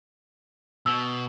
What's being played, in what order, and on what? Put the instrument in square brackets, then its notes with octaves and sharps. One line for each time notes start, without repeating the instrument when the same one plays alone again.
[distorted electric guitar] B2 [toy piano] E6